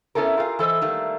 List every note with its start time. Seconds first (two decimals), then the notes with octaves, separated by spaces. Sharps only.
0.15 B3 C#4 E4 A4 A#4
0.37 F4 G4 G#4 A#4 F5
0.59 E3 A4 C5 D#5
0.81 D#3 G3 A3 A#3